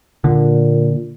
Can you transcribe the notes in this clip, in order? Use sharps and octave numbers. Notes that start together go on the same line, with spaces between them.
A#2 D3